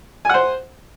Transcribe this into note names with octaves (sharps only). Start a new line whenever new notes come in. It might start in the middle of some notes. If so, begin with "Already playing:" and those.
C5 F#5 G#5